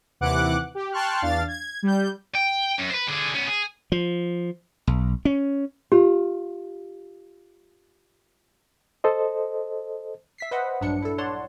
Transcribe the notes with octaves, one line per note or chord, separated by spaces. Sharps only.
D#2 C3 E3 F#5 D6 F#6
G4
G5 A5 C6 C#6 F6 F#6
E2 D4 F5 A6
G#6
G3 G6
G5
F#2
B4 C5
D3 G#4
B3 C#4
G#4
F3
B1
C#4
F4 G4
A4 C5 D#5
E5 B6 C7
B4 C5 D#5 E5 F#5
A#1 G2 F#3 D4 C#7
E4 A4
C#5 D5 F#5 A5 C6